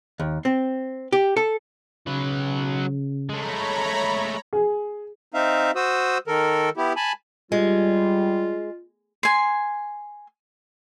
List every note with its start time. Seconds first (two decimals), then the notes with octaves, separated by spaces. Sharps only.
0.20 D#2
0.45 C4
1.13 G4
1.37 A4
2.07 C#3 F#3 B4
3.30 G#3 A3 C#5 A#5 B5
4.53 G#4
5.34 C4 D#4 E5 F5
5.76 F#4 C5 D#6 E6
6.27 D#3 A4 A#4
6.77 B3 E4 G4
6.96 G#5 A5 B5
7.52 G3 G#3 F4
9.23 G#5 C6